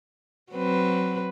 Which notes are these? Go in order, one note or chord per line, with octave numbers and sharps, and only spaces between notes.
F#3 C4 B4